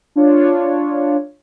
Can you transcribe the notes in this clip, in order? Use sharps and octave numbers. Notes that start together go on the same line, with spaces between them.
D4 F4 C#5